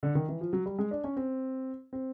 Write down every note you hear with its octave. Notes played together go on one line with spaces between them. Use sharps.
D3
D#3
E3
F3
F#3
G3
G#3
D4
C#4
C4
C4